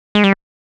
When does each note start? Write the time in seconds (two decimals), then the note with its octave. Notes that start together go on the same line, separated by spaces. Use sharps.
0.15 G#3
0.24 G3